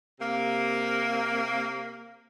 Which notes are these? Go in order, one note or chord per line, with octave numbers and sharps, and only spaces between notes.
C3 A#3